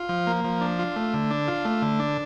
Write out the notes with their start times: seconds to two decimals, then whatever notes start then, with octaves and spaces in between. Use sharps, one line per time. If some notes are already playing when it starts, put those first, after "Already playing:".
Already playing: F4
0.09 F3
0.27 A#3
0.44 F3
0.61 D4
0.79 F4
0.96 A3
1.14 D3
1.31 D4
1.48 F4
1.65 A3
1.82 D3
2.00 D4